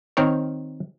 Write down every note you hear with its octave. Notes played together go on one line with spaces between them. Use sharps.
D#3 C4 A#4 C#5